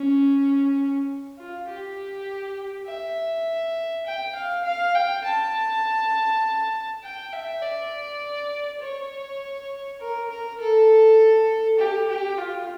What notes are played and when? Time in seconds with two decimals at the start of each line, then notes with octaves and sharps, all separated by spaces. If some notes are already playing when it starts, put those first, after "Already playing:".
Already playing: C#4
1.38 F4
1.68 G4
2.88 E5
4.06 G5
4.35 F5
4.65 F5
4.95 G5
5.24 A5
7.03 G5
7.33 E5
7.63 D5
8.81 C#5
10.01 A#4
10.30 A#4
10.60 A4
11.78 G4
12.08 G4
12.38 F4